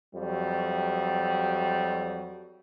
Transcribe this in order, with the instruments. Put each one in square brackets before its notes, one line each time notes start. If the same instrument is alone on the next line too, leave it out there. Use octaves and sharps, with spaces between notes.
[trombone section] F2 F#3 G3